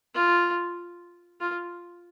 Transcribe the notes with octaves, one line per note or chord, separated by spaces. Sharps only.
F4
F4